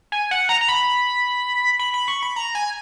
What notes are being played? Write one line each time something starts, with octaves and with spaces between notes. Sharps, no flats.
G#5
F#5
A#5
A#5
B5
B5
B5
C#6
B5
A#5
G#5